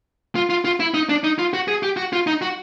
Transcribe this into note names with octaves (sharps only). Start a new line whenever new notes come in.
F4
F4
F4
E4
D#4
D4
D#4
F4
F#4
G#4
G4
F#4
F4
D#4
F#4